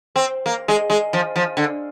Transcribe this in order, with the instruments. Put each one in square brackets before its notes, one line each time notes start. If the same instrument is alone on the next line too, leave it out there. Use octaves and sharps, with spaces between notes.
[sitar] C4
A#3
G#3
G#3
F3
F3
D3